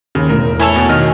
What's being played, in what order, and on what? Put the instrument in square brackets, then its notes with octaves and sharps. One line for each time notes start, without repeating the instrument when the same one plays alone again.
[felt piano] D#2 [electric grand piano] C#3
[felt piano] E1 A2 [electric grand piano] A#4
[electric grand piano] E4 A5 [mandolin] A4 C#5 G#5
[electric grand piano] B2
[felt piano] B2 [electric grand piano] D#3 D#5 F6